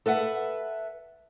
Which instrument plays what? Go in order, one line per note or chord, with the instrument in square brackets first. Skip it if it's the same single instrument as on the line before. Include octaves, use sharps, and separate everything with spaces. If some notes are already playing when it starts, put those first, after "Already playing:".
[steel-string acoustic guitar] A4 B4 E5 F#5